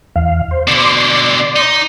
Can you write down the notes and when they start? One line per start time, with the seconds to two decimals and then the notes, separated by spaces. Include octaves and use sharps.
0.16 E2 F5
0.51 C5
0.67 B2 D3 D5 C6 D6
1.56 D#4